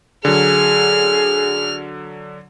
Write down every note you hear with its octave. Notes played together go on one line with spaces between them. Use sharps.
D3 F#3 G#4 F6